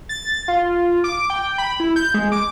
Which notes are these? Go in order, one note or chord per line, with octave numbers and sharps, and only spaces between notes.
A6
F4
D6
G5
B5
E4
G6
G#3
D6